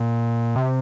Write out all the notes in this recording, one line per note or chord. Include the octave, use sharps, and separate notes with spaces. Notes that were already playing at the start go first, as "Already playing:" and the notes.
Already playing: A#2
C3